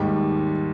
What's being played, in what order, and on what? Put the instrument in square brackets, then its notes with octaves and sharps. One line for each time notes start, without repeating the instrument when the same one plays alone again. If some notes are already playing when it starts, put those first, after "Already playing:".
Already playing: [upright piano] D#2 D#3 G3 [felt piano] G#2